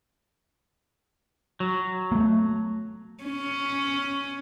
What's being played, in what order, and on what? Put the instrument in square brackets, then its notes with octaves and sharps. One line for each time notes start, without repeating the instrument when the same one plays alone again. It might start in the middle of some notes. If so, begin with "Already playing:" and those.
[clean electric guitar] F#3
[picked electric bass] A3 A#3
[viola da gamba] C#4